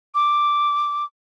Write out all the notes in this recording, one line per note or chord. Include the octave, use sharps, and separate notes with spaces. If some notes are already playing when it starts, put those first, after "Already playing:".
D6